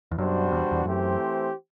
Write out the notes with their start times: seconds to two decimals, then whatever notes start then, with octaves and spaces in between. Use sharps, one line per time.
0.11 E2
0.18 F#2 B2 G3 D4 F#4 C5
0.52 E2
0.72 E2
0.85 F#2 E3 A3 C4 G4 C5